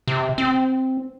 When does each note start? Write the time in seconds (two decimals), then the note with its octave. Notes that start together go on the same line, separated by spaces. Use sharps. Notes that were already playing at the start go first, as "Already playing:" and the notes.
0.07 C3
0.38 C4